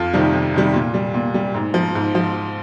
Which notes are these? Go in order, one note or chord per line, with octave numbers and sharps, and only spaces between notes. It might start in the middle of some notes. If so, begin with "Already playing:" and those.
Already playing: F2 F4
C3 D#3 G3
F2
C3 D#3 G3
A#2
G3
A#2
G3
G#2
F3
G#2
F3